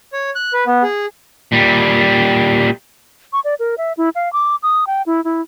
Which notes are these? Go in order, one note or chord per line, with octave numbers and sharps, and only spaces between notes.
C#5
F#6
B4
B3
G#4
A#2 G3
C#6
D5
A#4
E5
E4
F5
D6
D#6
G5
E4
E4